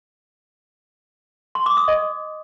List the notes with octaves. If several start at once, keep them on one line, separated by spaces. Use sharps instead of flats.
C6
D6
D#6
D#5